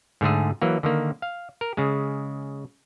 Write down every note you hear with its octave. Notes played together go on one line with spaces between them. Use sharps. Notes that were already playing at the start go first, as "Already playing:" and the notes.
G#2 D3 A3 G#4
E3 F#3 A#3
D3 D#3 A#3
F5
A#4
C#3 G#3